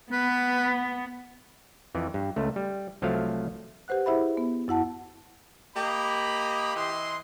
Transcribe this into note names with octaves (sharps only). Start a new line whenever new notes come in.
B3 B4
F2 E3
G2
C#2 A3
G3
C2 F3 F#3 A3 F5
G4 B4 C5 F#5 F#6
E4 G#4 C5 E5 F#5 B5
B3
F#2 E4 F#5 A5
A#3 G4 D#5 B5
E3 D#5 C6